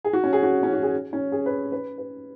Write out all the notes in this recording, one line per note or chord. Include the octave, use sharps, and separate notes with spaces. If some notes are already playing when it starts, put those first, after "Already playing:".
G#4
F#4
C#4
G#4
F#4
C#4
F#4
G#4
C#4
G#4
B4
B4
B4